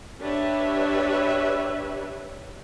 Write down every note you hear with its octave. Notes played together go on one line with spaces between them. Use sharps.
D4 G4 B4 C#5 E5